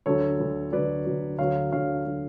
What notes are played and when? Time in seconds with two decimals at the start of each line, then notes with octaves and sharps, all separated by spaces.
0.06 D2 D3 F#3 A4 C#5
0.39 D2 D3 F#3
0.72 D2 D3 F#3 B4 D5
1.05 D2 D3 F#3
1.38 D2 D3 F#3 C#5 F5
1.72 D2 D3 F#3 C#5 F5
2.05 D3 F#3